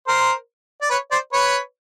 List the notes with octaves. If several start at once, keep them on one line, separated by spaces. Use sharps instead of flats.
A#4 C5
D5
B4 C#5
C5 D5
B4 C#5